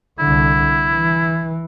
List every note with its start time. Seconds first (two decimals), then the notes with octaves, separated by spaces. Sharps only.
0.20 C2 D3 E4
0.92 E3